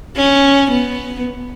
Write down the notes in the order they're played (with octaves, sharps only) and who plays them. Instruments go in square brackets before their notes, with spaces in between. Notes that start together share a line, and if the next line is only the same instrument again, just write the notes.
[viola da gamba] C#4
B3